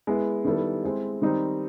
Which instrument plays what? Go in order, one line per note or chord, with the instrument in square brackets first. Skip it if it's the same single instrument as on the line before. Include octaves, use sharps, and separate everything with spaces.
[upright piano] G#3 B3 E4
D#3 G3 B3 E4 A4
G#3 C4 E4
D#3 G3 C4 D#4